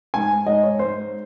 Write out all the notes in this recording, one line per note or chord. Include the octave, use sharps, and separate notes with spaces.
G#2 G#5
G#2 D#5
C#5
G#2 C5